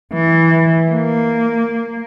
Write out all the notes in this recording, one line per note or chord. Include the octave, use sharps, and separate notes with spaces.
E3
A#3